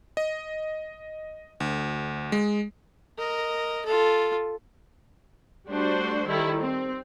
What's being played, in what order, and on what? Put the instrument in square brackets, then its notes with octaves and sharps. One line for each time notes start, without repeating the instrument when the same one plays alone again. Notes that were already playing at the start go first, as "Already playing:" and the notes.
[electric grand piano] D#5
D2
G#3
[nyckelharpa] A#4 D#5
F4 A4
[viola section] G3 A3 D4 F#4 C5
D#3 G3 E4 A4
C4